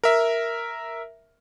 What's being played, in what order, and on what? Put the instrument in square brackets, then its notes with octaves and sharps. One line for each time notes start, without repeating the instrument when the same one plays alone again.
[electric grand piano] A#4 E5